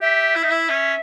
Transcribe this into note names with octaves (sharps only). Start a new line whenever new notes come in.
G4 E5
E4
D#4
E4
C#4